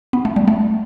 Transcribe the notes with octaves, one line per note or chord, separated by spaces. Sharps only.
B3
A3
G3
A3